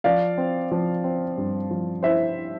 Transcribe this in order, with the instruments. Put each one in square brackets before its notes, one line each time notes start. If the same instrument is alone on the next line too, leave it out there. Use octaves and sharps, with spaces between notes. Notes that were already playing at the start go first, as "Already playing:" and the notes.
[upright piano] F3 D5 F5
C4
F3
C4
G2
F3
E4 C5 E5